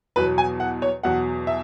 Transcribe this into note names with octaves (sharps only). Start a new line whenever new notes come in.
E2 B2 F#3 B4
G#5
F#5
C#5
E2 B2 F#3 F#5
E5